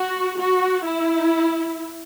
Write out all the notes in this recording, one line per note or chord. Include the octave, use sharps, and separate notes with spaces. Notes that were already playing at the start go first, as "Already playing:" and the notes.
Already playing: F#4
F#4
E4